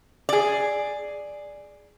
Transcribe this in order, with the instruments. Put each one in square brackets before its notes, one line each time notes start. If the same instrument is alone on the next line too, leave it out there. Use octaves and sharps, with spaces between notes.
[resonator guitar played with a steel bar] G#4 D5